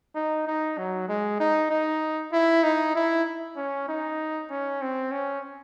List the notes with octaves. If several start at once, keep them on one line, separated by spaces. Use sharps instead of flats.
D#4
D#4
F#3
G#3
D#4
D#4
E4
D#4
E4
C#4
D#4
C#4
C4
C#4